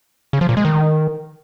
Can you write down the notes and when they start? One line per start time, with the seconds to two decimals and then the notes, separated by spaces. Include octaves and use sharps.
0.33 C#3
0.41 F3
0.49 A#2
0.57 G#3
0.65 D#3